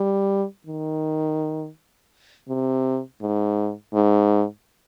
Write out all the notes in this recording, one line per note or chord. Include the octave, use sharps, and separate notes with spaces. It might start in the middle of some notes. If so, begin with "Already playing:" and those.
Already playing: G3
D#3
C3
G#2
G#2